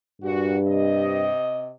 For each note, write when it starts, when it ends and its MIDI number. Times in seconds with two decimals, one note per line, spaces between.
0.22 1.30 43
0.22 0.56 46
0.22 0.56 66
0.66 1.70 48
0.66 1.70 75